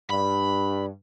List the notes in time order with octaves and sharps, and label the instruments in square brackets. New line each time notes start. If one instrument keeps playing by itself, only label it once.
[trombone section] G2 [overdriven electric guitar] B5